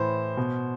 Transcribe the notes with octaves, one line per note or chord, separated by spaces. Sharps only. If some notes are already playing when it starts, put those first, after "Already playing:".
Already playing: A2 E3 C5
B2